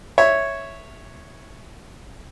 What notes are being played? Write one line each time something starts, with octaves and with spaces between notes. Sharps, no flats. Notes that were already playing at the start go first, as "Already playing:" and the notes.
C#5 E5